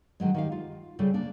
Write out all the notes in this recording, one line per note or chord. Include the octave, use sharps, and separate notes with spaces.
D3 D#3 F#3 G#3
D#3 G4 F5
F4
C#3 G3 G#4 A4
A#3 D4